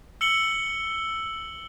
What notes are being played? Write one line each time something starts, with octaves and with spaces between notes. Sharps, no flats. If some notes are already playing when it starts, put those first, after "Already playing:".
E6 C#7 F#7 G7